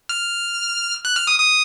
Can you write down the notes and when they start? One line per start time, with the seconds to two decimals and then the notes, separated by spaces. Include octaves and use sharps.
0.09 F6
1.05 F#6
1.16 F6
1.27 D#6
1.39 D#6